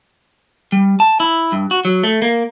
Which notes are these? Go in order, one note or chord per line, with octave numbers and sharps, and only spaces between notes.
G3
A5
E4
G2
F#4
F#3
A3
A#3